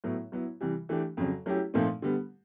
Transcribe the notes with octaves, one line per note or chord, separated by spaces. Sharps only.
A2 F#3 B3 E4
F#3 B3 E4
C3 E3 G3
E3 A3 D4 G4
F2 C#3 F#3
F#3 A3 C#4 E4 G4
A#2 F3 A3 C4 D#4
D3 G3 B3